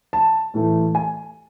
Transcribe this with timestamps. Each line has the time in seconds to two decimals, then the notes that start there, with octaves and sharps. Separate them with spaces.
0.13 A5
0.54 A2 E3 A3
0.95 G#5